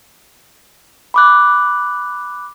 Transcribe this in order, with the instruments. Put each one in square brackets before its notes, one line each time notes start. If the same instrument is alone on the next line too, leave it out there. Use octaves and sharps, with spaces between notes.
[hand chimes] B5 D6 F#6